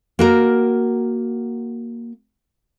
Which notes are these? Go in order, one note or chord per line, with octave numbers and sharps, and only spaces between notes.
A#3 F#4 A#4